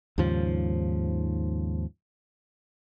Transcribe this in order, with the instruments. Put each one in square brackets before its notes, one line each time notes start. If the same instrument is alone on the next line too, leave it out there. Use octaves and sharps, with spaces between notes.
[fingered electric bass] D#2 G#2 C#3 F3